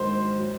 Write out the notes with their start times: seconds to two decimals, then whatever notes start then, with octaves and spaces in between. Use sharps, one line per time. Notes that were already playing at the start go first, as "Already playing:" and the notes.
Already playing: G#2 D#3 F#3 C5 C6
0.39 F#3